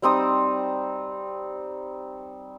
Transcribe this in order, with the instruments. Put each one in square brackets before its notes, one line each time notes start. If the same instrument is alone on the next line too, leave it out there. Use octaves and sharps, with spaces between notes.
[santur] G3 C4 D#4 D#6